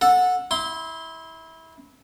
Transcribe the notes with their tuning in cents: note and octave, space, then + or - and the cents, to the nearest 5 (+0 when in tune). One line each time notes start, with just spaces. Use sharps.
A4 +0 F#5 -20
E4 -25 C6 +0